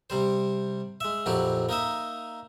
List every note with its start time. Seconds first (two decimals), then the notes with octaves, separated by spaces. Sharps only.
0.10 C3 G3 C5
1.01 G#3 E5
1.26 A#1 F2 F#3 E4 G4
1.69 A#3 D#4 D#5 E5